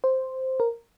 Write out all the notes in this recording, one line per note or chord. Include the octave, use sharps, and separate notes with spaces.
C5
A#4